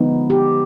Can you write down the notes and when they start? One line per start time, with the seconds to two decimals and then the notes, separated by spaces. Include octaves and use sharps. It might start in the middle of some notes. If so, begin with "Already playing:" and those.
Already playing: D3 F3 G#3 B3 D#4
0.30 G4